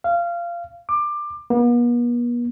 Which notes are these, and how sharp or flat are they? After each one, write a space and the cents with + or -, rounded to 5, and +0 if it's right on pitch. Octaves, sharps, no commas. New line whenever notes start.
F5 -20
D6 +20
B3 -45